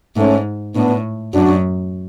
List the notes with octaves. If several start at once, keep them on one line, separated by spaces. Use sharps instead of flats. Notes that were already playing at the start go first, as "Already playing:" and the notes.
G#2 A3 C#4
A2 B3 D4
F#2 D4 F#4